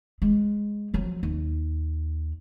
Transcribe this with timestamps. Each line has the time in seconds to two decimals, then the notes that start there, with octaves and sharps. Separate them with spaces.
0.22 G#3
0.94 F3 F#3
1.23 D#2